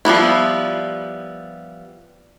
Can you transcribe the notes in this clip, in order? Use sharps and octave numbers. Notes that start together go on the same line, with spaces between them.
F3 G3 B3 E4